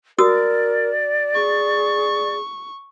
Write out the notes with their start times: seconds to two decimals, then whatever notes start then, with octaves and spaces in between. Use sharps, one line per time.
0.19 F#4 A#4 D5 D#6 E6
1.35 G#4 C#6